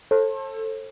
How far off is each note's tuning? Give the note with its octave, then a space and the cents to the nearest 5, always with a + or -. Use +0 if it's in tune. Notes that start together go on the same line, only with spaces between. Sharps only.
A4 +10 C5 +45